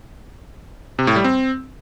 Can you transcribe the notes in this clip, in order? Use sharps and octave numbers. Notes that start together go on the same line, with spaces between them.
C3
A2
G3
C4